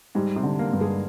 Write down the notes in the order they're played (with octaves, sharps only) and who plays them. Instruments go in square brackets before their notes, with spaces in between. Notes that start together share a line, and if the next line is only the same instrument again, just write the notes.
[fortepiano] G#2 [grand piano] G3
[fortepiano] C3
[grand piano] D3
[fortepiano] A#3
[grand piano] G2
[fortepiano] G#3